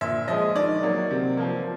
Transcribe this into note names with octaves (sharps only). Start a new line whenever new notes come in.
A#2 E5
F3 G#3 D#5
D#3 D5
F#3 A#3
C3
F3 A#3